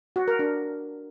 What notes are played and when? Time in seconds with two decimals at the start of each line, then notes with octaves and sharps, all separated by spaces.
0.16 F#4
0.28 A#4
0.39 D4